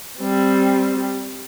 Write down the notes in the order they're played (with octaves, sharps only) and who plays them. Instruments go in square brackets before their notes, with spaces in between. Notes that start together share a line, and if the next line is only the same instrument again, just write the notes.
[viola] G3 C4